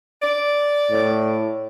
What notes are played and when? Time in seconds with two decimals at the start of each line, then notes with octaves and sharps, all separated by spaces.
0.22 D5
0.91 A2